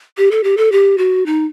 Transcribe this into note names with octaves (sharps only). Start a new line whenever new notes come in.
G4
A4
G4
A4
G4
F#4
D#4